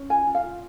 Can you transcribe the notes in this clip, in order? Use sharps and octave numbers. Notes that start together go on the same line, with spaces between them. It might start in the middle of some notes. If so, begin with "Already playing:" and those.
Already playing: C#4
F4 G#5
F4
F5
F4